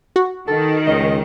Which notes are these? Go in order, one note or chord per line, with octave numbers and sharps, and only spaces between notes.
F#4
D#3 A4
C#2 D#5